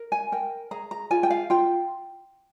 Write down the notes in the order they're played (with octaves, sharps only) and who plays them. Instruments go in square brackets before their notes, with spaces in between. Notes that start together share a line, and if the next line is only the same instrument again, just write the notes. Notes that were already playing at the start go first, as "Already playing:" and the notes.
Already playing: [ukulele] A#4
G#5
A#4 G5
G#4 A#5
A#5
F4 G#5
G5
F5
F4 G5